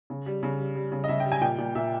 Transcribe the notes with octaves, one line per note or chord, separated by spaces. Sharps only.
C#3
G3
C#3
G3
G3
C#3
D#5
C#3 E5
G5
G3
G#5
A#2 G5
A#2
A#2 E5